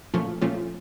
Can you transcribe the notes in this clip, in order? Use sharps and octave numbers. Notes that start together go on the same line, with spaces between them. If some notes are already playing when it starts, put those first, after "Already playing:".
A#2 F3 A3 C#4 F4
A#2 F3 A3 C#4 F4